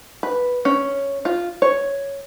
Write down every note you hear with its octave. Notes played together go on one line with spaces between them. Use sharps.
B4
C#4
F4
C#5